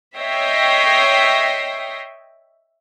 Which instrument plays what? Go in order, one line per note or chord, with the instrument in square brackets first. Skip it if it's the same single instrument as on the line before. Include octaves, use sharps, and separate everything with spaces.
[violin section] C#5 D#5 E5 G5 A#6 C7